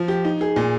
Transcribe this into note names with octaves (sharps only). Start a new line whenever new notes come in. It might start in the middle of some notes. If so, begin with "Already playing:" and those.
Already playing: F3
G4
D#4
G#4
A#2